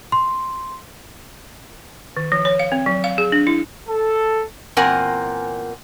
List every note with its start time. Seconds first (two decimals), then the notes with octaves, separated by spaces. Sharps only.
0.12 C6
2.17 D#3
2.32 F3
2.45 C#5
2.59 F5
2.72 C4
2.86 F#3
3.04 F5
3.18 G#4
3.32 D4
3.47 E4
3.88 A4
4.77 E2 A#2 C4 A#4 F#5 G#5